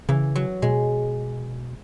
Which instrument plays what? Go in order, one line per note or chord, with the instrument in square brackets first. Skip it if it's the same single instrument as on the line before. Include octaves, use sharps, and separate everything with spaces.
[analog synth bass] C#3 [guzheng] E3
[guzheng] F#3
[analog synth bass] B2 [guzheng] G#3